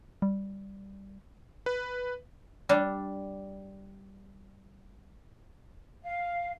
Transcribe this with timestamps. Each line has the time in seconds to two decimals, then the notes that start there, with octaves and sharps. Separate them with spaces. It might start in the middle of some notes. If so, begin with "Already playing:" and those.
0.22 G3
1.66 B4
2.69 G3 D4
6.03 F5